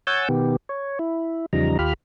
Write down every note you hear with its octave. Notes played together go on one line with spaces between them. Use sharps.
C#5 F#5 G#5 E6 G6 A6
B2 D#3 B3 G4
C#5
E4
E2 C#3 F3 G3 D#4 A#5
D#2 F4 G4 B5 F6